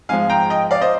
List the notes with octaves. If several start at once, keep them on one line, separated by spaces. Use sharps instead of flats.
G#2 F3 G#3 F5 G#5
G5 A#5
D#5 G5
D5 F5
C5 D#5